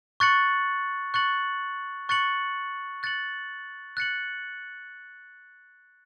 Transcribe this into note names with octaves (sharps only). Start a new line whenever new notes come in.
C#6 F#6 A6 C#7 F#7
C#6 F#6 A6 C#7 F#7
C#6 F#6 A6 C#7 F#7
F#6 A6 C#7 F#7
F#6 A6 C#7 F#7